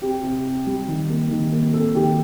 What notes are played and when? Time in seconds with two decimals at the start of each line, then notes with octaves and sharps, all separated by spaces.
0.02 C4 G4
0.23 C3
0.45 C3
0.67 G3
0.88 D#3
1.09 A#3
1.30 D#3
1.52 A#3
1.74 C4 A4
1.95 D#3 G4